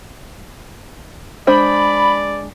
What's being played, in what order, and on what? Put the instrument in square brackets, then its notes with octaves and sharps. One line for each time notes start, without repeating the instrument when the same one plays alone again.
[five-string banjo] G#3 D4 C5 [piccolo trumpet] D5 [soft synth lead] B5